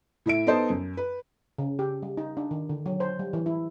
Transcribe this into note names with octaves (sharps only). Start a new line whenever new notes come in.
A2 E4 E5 D7
B3 D#4 A4 C5 A5
F#2
B4
C#3
G4
G3
D#4
D4
D#3
D3
F#3
C5
G3
E3
E4